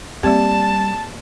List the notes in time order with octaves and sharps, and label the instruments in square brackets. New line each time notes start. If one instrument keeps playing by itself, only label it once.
[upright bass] G3 [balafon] A#3 C4 [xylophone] G4 D5 [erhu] A5